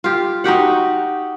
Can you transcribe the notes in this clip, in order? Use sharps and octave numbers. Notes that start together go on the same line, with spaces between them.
F4 G4
D#4 F#4 G4 F#5